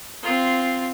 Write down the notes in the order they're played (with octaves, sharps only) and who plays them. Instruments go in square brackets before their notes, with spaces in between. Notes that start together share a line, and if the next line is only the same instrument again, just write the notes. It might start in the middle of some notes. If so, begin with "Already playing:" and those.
[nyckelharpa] C4 F4